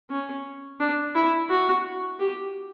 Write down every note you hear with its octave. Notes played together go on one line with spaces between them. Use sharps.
C#4
D4
E4
F#4
G4